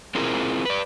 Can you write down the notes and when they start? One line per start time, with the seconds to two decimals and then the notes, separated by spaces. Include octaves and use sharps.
0.15 C4 E4 F4 G#4 A#4 C5
0.65 B4 D5